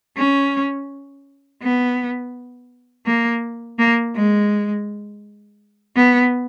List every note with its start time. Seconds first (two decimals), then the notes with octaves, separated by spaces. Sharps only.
0.17 C#4
1.63 B3
3.06 A#3
3.79 A#3
4.16 G#3
5.96 B3